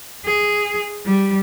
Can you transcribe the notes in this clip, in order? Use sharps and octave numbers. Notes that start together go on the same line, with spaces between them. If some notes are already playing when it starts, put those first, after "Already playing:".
G#4
G3